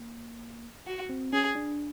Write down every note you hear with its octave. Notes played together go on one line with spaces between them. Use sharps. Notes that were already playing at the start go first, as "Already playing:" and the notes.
Already playing: A#3
F#4
C4
C#4 G#4
D4